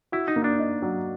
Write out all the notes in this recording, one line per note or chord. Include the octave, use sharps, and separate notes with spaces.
E4 F#4
D#4
A#3
D4
D#4
F#3